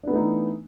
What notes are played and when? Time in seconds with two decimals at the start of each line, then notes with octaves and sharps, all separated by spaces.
0.03 D4
0.07 B3
0.11 A3
0.15 D#4
0.19 E3